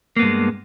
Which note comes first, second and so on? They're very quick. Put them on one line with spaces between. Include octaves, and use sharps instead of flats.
A#3 B3 G2 G#3